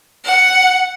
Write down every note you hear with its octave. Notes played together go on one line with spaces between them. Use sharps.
F#5